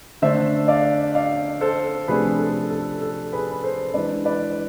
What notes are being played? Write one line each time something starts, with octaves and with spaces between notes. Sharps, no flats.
D3 A3 D4 C5 E5
D5 F5
D5 F5
A4 C5
C3 F3 A3 D4 G#4 B4
A4
A4
A4
G#4 B4
B4
A4 C5
E3 G#3 D4 B4 D5
B4 D5
B4